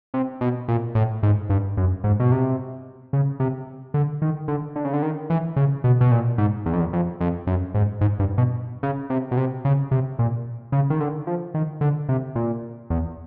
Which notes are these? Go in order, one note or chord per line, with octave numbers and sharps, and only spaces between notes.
C3
B2
A#2
A2
G#2
G2
F#2
G#2
B2
C3
C#3
C3
D3
D#3
D3
D3
C#3
D3
D#3
E3
C#3
B2
B2
A#2
G#2
E2
F2
E2
F2
F2
F#2
G#2
G#2
G2
B2
C#3
C3
B2
C3
C#3
C3
A#2
C#3
D#3
D3
F3
D#3
D3
C3
A#2
E2